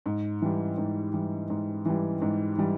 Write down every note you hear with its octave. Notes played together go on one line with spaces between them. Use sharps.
G#2
E3 G3
G#2
E3 G3
G#2
E3 G3
G#2
E3 G3